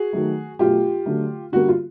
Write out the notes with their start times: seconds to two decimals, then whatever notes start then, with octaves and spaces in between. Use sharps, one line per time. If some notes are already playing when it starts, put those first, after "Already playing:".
Already playing: F#4 G#4
0.13 D#3 F#3 A3
0.59 B2 F#3 A3 F4 G4
1.06 D3 F#3 A3
1.52 D3 G3 A#3 F#4
1.69 F4